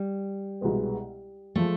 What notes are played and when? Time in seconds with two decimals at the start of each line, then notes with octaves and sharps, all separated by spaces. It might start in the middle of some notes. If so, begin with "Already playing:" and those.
Already playing: G3
0.61 C2 B2 G#3 B3
1.56 F3 G#3 A3